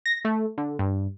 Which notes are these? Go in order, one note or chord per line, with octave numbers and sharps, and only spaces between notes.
A#6
A3
D3
G2